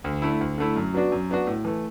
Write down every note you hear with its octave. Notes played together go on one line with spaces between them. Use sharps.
D2
D3 A3 E4
D2
D3 A3 E4
F#2
F#3 B3 D4 F#4
F#2
F#3 B3 D4 F#4
A2
E3 A3